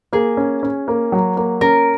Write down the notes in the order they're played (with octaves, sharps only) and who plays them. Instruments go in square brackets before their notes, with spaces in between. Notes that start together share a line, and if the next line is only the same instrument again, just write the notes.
[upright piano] A#3 [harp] G#4
[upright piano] C#4
C#4
A#3
F#3
A#3
[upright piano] C#4 [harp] A#4